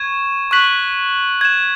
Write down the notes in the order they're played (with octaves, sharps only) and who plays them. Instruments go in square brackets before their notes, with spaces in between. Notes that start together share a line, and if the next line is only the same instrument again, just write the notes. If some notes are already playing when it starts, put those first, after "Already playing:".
Already playing: [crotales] C#6 G#6 E7
C#6 F#6 B6 F#7
G#6 E7